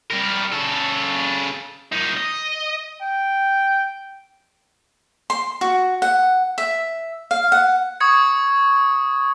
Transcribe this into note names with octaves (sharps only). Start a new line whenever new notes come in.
G3 A#4
C#3 A4
A#2 D#4
D#5
G5
C6
F#4
F#5
E5
F5
F#5
C#6 D#6 G#6 C#7